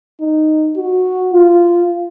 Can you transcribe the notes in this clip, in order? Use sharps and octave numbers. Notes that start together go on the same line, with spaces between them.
D#4
F#4
F4